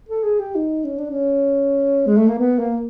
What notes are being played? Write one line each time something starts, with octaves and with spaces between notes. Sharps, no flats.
A4
G#4
G4
D#4
C#4
D4
C#4
G#3
A3
A#3
B3
A#3